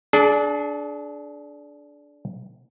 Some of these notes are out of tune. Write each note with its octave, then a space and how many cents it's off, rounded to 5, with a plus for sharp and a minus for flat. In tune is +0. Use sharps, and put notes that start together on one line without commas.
D4 -10 G#4 +35